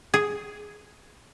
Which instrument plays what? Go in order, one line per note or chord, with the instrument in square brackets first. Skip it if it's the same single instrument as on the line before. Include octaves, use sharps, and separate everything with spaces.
[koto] G#4